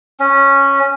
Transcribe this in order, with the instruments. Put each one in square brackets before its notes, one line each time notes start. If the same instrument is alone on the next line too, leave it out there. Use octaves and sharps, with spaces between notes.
[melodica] C#4